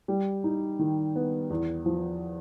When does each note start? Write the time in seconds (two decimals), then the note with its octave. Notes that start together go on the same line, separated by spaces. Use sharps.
0.08 G3
0.44 D#4
0.79 D#3
1.16 B3
1.50 E2
1.86 F3